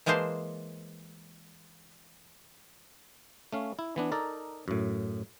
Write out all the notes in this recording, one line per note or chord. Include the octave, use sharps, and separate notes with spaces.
E3 G#3 A#3 G#4 C5 A5
A3 C#4 F5
E4
E3 B3 D4
D#4 A4 A#4 D5
F#2 A2